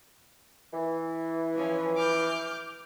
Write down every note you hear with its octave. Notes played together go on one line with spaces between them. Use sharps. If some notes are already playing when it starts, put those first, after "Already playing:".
E3
F3 C#4
D6 F6 G6